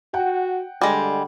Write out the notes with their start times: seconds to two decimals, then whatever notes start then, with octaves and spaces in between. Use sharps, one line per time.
0.14 F#4 F#5 G5
0.82 D3 G3 G#3